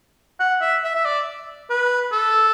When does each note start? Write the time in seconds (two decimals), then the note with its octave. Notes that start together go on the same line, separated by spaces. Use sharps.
0.40 F#5
0.61 E5
0.84 E5
0.95 E5
1.05 D5
1.70 B4
2.12 A4